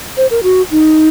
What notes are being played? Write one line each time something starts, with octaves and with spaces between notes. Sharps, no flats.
C5
A#4
F#4
D#4